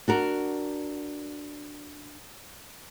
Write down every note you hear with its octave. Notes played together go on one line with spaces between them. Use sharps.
D4 F#4 A#4